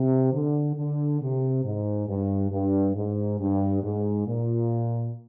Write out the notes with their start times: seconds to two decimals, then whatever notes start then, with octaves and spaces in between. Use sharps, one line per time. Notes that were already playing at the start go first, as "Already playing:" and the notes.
Already playing: C3
0.33 D3
0.76 D3
1.21 C3
1.63 G#2
2.08 G2
2.51 G2
2.95 G#2
3.39 G2
3.82 G#2
4.26 A#2